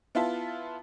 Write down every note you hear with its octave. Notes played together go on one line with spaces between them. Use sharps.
B3 E4 F4 E5 A5